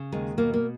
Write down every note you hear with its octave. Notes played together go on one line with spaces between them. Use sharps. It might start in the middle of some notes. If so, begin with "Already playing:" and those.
Already playing: C#3
D#2 G#3
B2 A#3
A#3